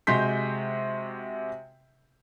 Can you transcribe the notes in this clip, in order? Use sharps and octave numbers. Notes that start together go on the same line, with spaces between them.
C3 G#3 F#4 C6 G6 B6